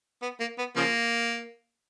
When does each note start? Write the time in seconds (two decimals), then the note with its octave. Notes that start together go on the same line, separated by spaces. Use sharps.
0.22 B3
0.40 A#3
0.58 B3
0.76 C#3 F3 A#3